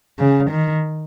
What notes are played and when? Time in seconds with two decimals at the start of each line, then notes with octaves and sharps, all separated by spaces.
0.19 C#3
0.50 D#3